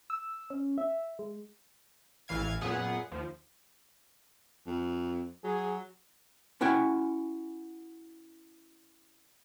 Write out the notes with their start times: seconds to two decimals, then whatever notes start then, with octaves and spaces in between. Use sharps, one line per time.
0.10 E6
0.50 C#4
0.78 E5
1.19 G#3
2.28 A1 E3 F5 G#6
2.61 F#2 A#2 B3 G#4 F#5
3.11 D#2 F3
4.67 F2
5.44 F#3 G#4
6.61 C#4 E4 F#4 G5 G#5